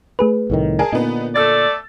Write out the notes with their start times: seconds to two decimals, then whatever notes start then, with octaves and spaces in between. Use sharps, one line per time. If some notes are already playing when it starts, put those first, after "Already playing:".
0.19 A3 G#4 B4
0.50 C2 A2 D#3
0.79 G#4 A#4 G#5 A5
0.92 A#2 D3 B3 D#4
1.36 A3 A4 D5 E6 A6